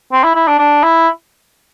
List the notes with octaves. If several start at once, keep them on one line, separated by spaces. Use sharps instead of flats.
C4
E4
E4
D4
D4
E4